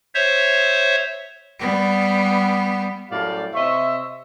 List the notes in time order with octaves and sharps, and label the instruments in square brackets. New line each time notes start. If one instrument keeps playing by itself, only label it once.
[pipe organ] C5 C#5 E5
[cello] G3 B3
[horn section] F#2 A2 G3 D5 F5
C3 C5 C#5 D#5 E5